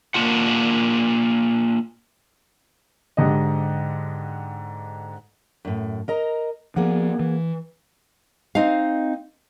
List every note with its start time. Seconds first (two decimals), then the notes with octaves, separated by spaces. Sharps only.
0.14 A#3 B3 D4 F4 F#5
3.17 G#2 D3 G4 D#5
5.65 F#2 A2
6.08 A#4 D#5 A#5
6.76 F3 A#3 B3 G#4 F#5
7.20 E3
8.55 C4 D#4 D#5 F5